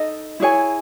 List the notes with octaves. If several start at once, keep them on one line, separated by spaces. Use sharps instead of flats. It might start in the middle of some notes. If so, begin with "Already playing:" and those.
Already playing: D#4 A4 D#5
E4 G#4 C#5 G#5